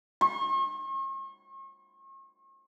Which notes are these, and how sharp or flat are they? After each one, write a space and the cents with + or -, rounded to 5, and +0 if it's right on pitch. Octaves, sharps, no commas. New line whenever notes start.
C#6 -45